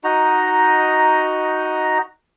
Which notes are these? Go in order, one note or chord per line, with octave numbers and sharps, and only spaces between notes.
D#4 F#4 D#5 A#5